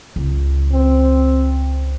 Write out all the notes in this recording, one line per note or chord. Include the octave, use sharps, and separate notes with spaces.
C#2
C4